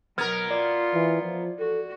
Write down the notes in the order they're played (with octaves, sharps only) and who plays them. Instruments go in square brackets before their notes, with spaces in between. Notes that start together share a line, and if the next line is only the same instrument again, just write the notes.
[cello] B2 F#3 [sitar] B3 A#4 [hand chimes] F6 G#6
[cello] F4 [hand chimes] D5
[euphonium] E3
F3
[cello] F#4 [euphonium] A4